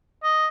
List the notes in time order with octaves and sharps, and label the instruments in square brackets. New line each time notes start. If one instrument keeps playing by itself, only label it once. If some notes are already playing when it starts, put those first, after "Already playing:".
[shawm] D#5